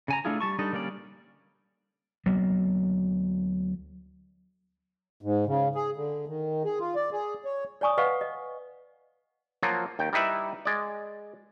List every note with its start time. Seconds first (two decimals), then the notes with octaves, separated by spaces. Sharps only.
0.08 C#3 G#5 A#5
0.25 A3 D4 E4 F4 G#4
0.41 G3 A5 C#6
0.59 G3 D4 D#4 A4 D#5
0.72 D3 G3 A#3 C#4 D5
2.26 D2 F#3 A#3 B3
5.22 G#2
5.46 C#3
5.75 G#4
5.96 D3
6.28 D#3
6.65 G#4
6.80 F4
6.95 D5
7.12 G#4
7.45 C#5
7.81 C#5 D5 G#5 C#6 D#6
7.98 B4 D#5 F5 F#5 C#6
8.21 D#5
9.63 F3 F#3 A#3 F4 F#4
9.99 D#2 G5
10.13 G3 D#4 E4 B4 E5
10.65 G#3 D5